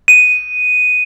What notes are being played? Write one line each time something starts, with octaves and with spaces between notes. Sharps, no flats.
D#7